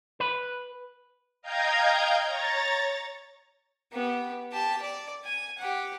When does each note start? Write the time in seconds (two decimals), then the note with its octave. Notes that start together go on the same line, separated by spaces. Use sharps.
0.20 B4
1.42 D#5 F5 G5 A#5 G6 G#6
2.24 C#5 A#5 A6
3.92 B3 G4
4.52 G4 A5
4.81 D5
5.24 G#5
5.58 G4 F#5